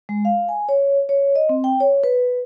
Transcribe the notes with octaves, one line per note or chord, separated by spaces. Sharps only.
G#3
F5
G#5
C#5
C#5
D#5
C4
G5
C#5
B4